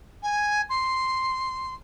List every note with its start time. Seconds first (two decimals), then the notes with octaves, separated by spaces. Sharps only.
0.23 G#5
0.69 C6